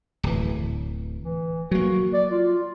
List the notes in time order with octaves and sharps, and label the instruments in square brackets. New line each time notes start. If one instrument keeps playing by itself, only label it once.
[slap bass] D1 E3
[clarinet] E3
[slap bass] F#3 A#3 [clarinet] F#4
[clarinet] D5
F4